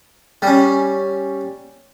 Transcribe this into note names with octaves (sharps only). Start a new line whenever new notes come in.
G3 C#4